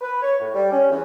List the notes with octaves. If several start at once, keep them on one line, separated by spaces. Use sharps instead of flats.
B4
C#5
A2
G3
C#4
E2